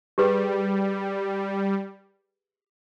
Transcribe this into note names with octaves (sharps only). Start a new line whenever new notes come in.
G3 G4 G#4 B4